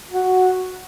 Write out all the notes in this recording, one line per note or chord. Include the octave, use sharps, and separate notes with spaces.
F#4